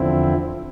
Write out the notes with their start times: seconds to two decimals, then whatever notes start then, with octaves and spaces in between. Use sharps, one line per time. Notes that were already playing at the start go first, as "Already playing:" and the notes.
Already playing: E2 D3 F3 C4 E4